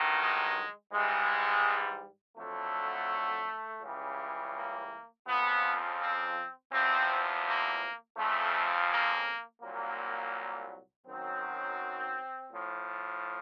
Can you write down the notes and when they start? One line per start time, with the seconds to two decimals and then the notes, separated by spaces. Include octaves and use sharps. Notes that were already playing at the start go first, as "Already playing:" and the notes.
Already playing: G2 D#3 F#3
0.20 G#3
0.92 G#2 E3 G3 G#3
2.37 F2 D3 F#3 A3
3.81 C#2 C#3 E3 G3
4.54 A#3
5.27 F2 C#3 F3 B3
5.99 C4
6.72 E2 C3 F3 C4
7.44 A#3
8.17 F2 C#3 F3 A3
8.89 A#3
9.62 C2 A#2 F#3 A#3
11.07 F#2 D#3 F#3 C4
12.52 A2 F3